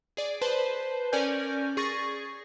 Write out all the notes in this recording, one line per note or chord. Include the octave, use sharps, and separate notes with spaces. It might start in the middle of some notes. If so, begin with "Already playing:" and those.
G#4 D5
B4 C5 A5
C#4 A#4 D5 G#5 G6
G#4 C#6 A6 A#6